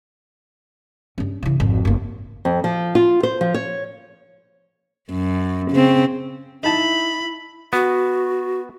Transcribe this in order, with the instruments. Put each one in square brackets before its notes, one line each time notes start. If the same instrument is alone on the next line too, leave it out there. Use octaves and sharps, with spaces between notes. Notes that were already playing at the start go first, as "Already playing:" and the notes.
[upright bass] G2 C#4
C#3 E3
G#1 F2
F#1 A#3
[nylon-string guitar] F2
F3
F4
C5
F3
C#5
[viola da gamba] F#2
C#3 C4
[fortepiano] D#4 A5 [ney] E4 [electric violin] B5
[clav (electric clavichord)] B3 [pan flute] F#4